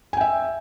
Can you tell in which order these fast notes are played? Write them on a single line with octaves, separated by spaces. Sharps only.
G#5 G5 E5